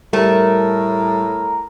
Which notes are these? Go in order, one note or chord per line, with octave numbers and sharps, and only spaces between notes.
A2 G3 A3 A#4